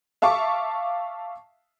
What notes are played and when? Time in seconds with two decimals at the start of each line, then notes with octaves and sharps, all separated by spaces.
0.22 E5 F5 A5 C#6 D6